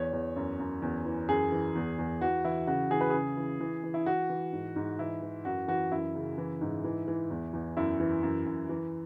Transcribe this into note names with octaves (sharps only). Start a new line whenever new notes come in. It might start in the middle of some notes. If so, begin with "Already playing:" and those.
Already playing: E2 C#5
E2
F#2
F#2
E2
E3
F#2 G#4
E3
E2
E2
E3 F#4
E3 E4
C#3 F#4
E3 G#4
B4
C#3 G#4
E3
E3
E3
E4
E3 F#4
E3
G#2
G#2
E3 E4
E3
F#2 F#4
E3 F#4
F#2 E4
C#3
E3
G#2
E3
E3
E2
E2
F#2 E4
E3
F#2
F#2
E3